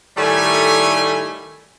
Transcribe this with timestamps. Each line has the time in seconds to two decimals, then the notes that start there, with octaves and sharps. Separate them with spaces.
0.16 A2 D#3 G3 A3 G#5